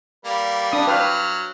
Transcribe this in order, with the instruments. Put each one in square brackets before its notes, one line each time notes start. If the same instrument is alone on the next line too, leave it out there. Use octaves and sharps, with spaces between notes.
[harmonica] G3 A#3 B4
[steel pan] D4 D#6
[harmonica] F#3 F6 [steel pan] B4 F5 G5